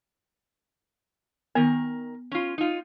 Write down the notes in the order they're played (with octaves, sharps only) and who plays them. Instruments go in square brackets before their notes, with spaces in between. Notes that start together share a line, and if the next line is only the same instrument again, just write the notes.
[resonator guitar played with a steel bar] D#3 A#4 [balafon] B3
[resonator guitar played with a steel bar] C#4 F4
D#4 F4